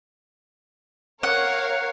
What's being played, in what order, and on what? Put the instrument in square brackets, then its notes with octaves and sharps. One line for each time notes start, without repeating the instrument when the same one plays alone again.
[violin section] A#4 C#5 F5 [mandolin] F#5